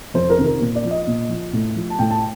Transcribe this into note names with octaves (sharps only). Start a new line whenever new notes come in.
F2 C5
A#4
C3 D#3
A#4
A#2
D5
F3
D#5
A#2
F3
A2
F3
A5
A2 G5
A5